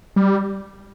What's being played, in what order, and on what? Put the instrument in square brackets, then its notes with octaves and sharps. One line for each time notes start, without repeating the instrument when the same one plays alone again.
[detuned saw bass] G3